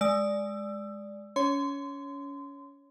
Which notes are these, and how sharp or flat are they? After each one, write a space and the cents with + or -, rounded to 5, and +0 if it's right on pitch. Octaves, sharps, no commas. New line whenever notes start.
G#3 +0 D5 +0 E6 +20
C#4 +25 C#5 +0 C6 -25